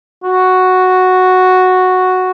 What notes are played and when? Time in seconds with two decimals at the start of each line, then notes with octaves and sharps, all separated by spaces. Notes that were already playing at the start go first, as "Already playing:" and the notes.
0.23 F#4